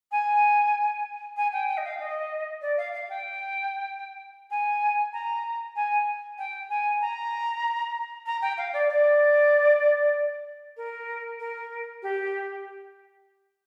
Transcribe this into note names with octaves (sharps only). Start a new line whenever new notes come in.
G#5
G#5
G5
G5
D#5
F5
D#5
D5
F5
F5
G5
G#5
A#5
G#5
G5
G#5
A#5
A#5
G5
F5
D5
D5
A#4
A#4
G4